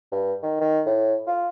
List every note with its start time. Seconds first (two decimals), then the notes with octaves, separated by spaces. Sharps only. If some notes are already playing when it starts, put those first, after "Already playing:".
0.12 G2
0.43 D#3
0.61 D#3
0.86 A2
1.27 F4